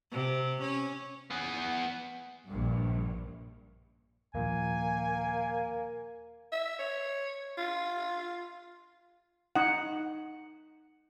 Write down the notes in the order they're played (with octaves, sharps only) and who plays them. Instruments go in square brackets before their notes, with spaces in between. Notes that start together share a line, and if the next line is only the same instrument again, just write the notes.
[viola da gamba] C3
C#4
[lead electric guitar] B3 G#4
[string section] A#1 G2
[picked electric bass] D#2 A#2 F3 [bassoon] A#3 [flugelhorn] G#5
[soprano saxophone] E5
C#5
F4
[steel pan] D#4 F#5